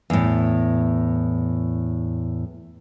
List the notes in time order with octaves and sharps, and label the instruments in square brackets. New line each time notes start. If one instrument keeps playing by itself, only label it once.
[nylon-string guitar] E2 A2